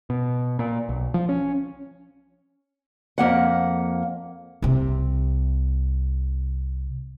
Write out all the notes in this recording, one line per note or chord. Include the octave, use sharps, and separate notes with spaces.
B2
A#2
B1
F3
C#4
F2 A#3 F#5
C2 C3